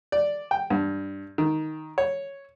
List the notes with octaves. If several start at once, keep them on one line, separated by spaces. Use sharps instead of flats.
D5
G5
G2
D#3
C#5